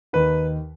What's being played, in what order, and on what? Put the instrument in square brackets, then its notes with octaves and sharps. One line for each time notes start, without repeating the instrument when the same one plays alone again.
[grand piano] D#2 D#3 B4